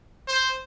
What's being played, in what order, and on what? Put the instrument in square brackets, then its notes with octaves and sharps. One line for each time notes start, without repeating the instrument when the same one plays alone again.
[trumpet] C5